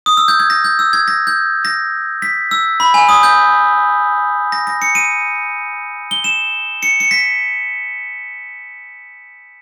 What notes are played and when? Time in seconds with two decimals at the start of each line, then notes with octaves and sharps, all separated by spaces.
0.06 D#6
0.17 E6
0.28 G6
0.40 G#6
0.50 A#6
0.64 G6
0.79 E6
0.93 G#6
1.08 A#6
1.27 G6
1.65 A#6
2.22 B6
2.51 E6
2.80 B5
2.94 G#5
3.09 D#6
3.23 G6
4.52 A#6
4.67 A#6
4.82 C#7
4.95 D#7
6.11 G7
6.24 E7
6.83 C#7
7.00 C#7
7.11 B6